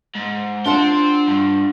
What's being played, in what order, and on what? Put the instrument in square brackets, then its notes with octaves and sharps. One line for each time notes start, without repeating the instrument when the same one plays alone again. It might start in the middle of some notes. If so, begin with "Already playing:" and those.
[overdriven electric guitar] G#2
[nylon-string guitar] D4 F4 F#5 [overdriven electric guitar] G5 C6
[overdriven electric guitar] G2